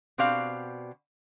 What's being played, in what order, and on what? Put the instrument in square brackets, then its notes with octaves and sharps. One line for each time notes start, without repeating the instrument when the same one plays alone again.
[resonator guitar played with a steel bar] B2 C4 G4 D5 F5